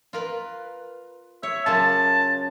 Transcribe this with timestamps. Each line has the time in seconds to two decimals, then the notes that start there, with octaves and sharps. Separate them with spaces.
0.13 F4 A#4 B4
1.43 C#5 E5
1.66 F#2 C#3 F4 A5